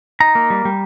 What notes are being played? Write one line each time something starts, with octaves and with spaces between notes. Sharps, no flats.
D#4 A#5
A#3
G3
G3